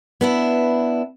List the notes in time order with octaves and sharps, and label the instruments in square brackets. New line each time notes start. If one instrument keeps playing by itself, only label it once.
[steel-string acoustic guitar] B3 D4 E4